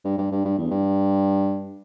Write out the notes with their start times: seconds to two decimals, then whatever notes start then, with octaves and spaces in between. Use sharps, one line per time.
0.05 G2
0.18 G2
0.31 G2
0.45 G2
0.58 E2
0.71 G2